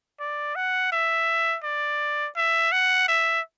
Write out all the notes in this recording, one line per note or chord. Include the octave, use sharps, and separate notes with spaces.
D5
F#5
E5
D5
E5
F#5
E5